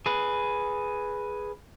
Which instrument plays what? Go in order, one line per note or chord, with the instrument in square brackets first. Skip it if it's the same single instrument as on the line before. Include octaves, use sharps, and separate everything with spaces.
[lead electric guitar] G#4 B4